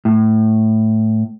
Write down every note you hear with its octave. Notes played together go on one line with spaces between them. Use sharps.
A2